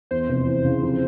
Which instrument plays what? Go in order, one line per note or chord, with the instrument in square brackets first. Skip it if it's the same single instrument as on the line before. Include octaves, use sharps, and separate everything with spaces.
[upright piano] E2 [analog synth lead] C5
[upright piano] F1
E3
C#3
F2